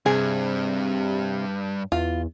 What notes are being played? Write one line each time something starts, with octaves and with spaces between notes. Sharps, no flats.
G2 C3 G#4
E2 F4